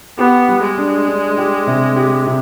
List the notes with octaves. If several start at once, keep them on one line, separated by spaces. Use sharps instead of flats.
B3 G4
G3
G#3
D4
D4
G4
C3
G4
C3